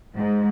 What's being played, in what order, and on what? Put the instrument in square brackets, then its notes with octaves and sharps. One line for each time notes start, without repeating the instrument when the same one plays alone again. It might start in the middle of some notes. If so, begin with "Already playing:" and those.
[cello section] G#2